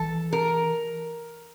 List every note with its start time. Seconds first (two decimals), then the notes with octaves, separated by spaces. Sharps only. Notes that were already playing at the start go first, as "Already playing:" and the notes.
Already playing: E3 A4
0.33 A#4